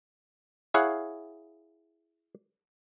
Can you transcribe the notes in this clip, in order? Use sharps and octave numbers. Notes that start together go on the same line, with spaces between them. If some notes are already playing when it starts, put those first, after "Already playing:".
E4 G#4 C#5 F5 F#5